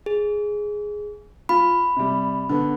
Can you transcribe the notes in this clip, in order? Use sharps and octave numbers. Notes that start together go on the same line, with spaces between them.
G#4
F4 B5
C3 G3
D3 B3